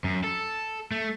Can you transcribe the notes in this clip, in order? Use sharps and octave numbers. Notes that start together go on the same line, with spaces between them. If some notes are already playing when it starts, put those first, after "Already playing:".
F#2
A4
A3